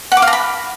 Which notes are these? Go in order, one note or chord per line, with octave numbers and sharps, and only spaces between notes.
F#5
D6
F5
A#5
B5